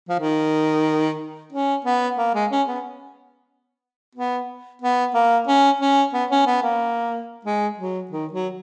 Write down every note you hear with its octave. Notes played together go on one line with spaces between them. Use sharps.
F3
D#3
C#4
B3
A#3
G#3
C#4
B3
B3
B3
A#3
C#4
C#4
B3
C#4
B3
A#3
G#3
F#3
D#3
F#3